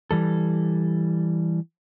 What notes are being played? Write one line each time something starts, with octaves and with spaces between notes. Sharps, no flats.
E3 G3 A4